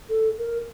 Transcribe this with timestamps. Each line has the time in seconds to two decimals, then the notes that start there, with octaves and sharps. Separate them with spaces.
0.09 A4
0.38 A#4